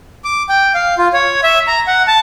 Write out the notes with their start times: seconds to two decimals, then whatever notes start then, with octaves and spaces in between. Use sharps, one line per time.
0.24 D6
0.49 G5
0.74 F5
0.98 F4
1.13 C#5
1.44 E5
1.68 A#5
1.87 F#5
2.07 A5